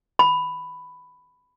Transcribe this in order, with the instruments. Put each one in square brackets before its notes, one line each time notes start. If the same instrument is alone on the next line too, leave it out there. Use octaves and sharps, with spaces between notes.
[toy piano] B5